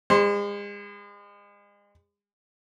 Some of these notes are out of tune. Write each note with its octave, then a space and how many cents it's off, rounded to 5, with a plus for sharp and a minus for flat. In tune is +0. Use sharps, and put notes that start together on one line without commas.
G#3 -35 C5 +0